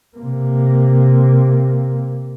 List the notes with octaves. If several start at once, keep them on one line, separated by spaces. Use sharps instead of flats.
C3 A#3